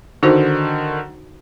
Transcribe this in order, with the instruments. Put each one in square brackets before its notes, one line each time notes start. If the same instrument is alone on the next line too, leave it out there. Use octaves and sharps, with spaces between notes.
[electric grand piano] D3 D#3 [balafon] D#4 F#4 C5